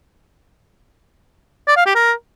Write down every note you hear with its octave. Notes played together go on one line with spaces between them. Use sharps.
D5
F5
G4
A#4